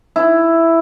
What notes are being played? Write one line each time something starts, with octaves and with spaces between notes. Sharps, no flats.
E4